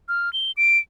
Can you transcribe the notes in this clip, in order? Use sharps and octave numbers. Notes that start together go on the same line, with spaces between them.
F6
G7
D7